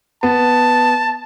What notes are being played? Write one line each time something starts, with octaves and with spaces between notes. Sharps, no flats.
B3 A5